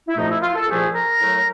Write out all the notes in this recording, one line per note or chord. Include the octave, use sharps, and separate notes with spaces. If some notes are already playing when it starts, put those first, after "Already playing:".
E4
C2 A#2 F3 A3 D#4
E4
F4
A4
C2 A#2 F3 A3 G#4
A#4
A2 F#3 A3